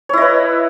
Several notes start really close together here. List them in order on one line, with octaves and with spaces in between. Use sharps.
C#5 E4 D#5 B4